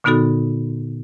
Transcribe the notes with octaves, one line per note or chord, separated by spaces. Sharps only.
A#2 D3 B3 D#4 F#4 A4